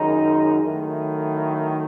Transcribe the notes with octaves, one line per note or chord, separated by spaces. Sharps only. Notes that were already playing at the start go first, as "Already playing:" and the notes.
Already playing: F#2 D#3 G#3 D#4
D#3 F#3 A3 E4